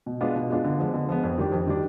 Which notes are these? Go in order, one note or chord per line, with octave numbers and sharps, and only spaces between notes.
B2
G#3 B3 D4 F4
B2
G#3 B3 D4 F4
D3
F3 G#3 B3
D3
F3 G#3 B3
F2
D#3 G3 D4
F2
D#3 G3 D4